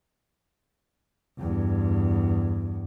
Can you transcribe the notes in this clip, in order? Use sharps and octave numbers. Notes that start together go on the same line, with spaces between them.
E2 G2